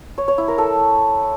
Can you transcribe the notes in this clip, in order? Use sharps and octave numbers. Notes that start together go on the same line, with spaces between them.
C#5
C#5
E4
A#4
A4